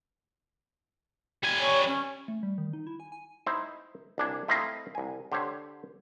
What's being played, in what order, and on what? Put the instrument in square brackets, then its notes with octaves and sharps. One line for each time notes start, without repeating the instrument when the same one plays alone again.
[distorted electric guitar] G3 G#5
[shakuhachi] C#5
C#4
[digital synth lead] A3
G3
D#3
D#4
E4
G#5
G#5
[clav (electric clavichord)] D#4 E4 C5
C2 D4 G#5
A3 C4 E4 D#5 F5 A#5
C2 G#5
D3 G4 C5 C#5